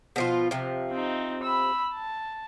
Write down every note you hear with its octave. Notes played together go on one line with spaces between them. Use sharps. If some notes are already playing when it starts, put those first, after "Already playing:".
B2 F3 F4
C3 F3
C4 D#4
B5 E6
A5